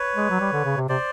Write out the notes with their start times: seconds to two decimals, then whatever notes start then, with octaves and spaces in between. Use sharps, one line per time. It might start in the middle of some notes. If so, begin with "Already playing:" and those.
Already playing: B4 C#5
0.16 G#3
0.30 F#3
0.40 G3
0.52 D3
0.65 C#3
0.77 C3
0.89 C3 C5 D5